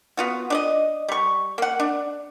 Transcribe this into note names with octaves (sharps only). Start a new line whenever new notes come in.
B3 F4 F#4
D4 D5 D#5
G3 C#6
A#3 F#5
D4